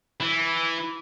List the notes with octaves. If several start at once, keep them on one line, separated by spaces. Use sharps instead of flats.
E3